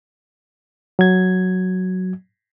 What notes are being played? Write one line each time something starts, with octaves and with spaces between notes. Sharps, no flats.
F#3 G#6